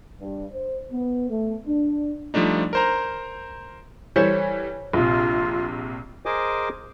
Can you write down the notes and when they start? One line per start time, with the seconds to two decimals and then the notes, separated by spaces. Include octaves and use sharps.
0.20 G2
0.52 C5
0.91 B3
1.29 A3
1.66 D4
2.34 F3 G3 A3 D4 D#4
2.73 A#4 C5 A#5
4.16 E3 G3 A4 C5 C#5
4.93 A#1 C3 F4
6.26 G#4 A#4 C5 D#5 G#5 D6